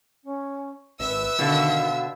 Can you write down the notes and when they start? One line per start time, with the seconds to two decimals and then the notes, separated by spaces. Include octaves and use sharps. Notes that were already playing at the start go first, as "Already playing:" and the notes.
0.23 C#4
1.00 G#1 B4 E5 E6
1.39 B2 D3 D#3 F5